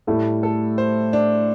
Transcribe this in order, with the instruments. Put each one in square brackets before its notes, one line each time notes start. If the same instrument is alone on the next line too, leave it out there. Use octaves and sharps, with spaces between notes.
[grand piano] A2 A3 [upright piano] G3
[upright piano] A4
C5
D4